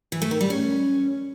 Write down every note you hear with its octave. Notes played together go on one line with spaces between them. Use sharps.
E3
A3
D#3
G3
C#4